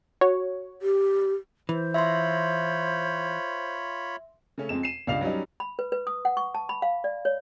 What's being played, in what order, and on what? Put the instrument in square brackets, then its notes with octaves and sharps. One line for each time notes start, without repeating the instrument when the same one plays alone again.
[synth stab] F#4 C#5
[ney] G4
[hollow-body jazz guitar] E3 [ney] C5
[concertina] F4 C#5 B5 [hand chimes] E5 C6
[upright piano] C#3 A3 C#4
F2 G#3 C4 E7
C7 D#7 E7
C#2 G2 D5 F5 C7 F7
F#3 G3 C#4 D#4
[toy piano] B5
B4
B4
D#6
F#5
C#6
A5
B5
F5
D5
C#5